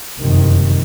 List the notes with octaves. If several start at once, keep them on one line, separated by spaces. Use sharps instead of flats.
F#1 F2 C3 D#3